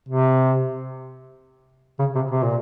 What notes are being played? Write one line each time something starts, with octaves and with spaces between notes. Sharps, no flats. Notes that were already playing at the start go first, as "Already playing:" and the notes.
C3
C#3
C3
C3
A#2